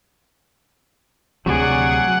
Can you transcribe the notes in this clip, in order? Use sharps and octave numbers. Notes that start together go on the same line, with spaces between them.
D2 C3 F#3 G#4 D5 F#5